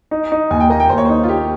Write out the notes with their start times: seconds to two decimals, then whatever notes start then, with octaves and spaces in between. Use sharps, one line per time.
0.11 D#4
0.32 D#4
0.50 D#2 G#5
0.60 G5
0.70 A#3 D#5
0.80 G5
0.89 D#2 C5
0.98 C#5
1.05 D#4 C5
1.23 F4
1.29 A#3 G4